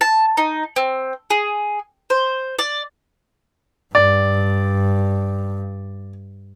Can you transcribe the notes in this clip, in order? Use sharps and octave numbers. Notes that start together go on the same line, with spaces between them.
A5
D#4
C4
G#4
C5
D5
G2 D5